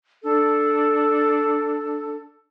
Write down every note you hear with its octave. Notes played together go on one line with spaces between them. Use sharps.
D4 A4